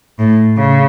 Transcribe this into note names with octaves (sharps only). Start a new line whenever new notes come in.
A2
C#3